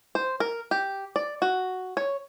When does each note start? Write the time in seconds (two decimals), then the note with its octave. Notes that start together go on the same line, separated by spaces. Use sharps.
0.15 C5
0.40 A#4
0.71 G4
1.16 D5
1.42 F#4
1.97 C#5